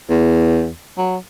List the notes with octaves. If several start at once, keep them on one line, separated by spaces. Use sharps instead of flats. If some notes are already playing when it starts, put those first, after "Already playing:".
E2
F#3